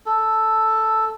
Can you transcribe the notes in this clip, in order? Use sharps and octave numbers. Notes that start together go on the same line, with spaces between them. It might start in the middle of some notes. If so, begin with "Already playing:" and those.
A4